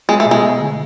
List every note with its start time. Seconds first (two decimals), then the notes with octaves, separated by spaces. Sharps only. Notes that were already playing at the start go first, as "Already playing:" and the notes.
0.09 G#3 B3
0.20 A3
0.26 B2
0.31 G#3
0.43 A3
0.60 D3